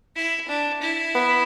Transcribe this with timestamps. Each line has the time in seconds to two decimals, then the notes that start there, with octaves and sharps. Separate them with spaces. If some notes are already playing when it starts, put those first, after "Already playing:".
0.16 E4
0.48 D4
0.82 E4
1.15 B3